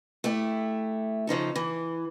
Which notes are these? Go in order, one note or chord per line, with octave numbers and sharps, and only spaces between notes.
A3 E4 G4
C#3 F3 D#4 A4
E3